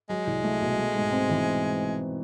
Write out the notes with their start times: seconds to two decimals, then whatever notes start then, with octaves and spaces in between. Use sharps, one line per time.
0.09 F#3 G#3
0.27 C2
0.44 A3
0.61 B2
0.78 A3
0.95 G#2
1.12 C4
1.29 E3